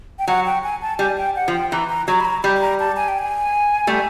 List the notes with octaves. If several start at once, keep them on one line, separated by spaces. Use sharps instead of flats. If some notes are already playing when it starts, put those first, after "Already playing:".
G5
F#3 F#5
G5
G#5
A5
G3 G#5
G5
F#5
F3
G5
E3 A#5
A#5
F#3 A#5
B5
A#5
G3 B5
B5
A#5
A5
G#5
G5
G#5
G3 A3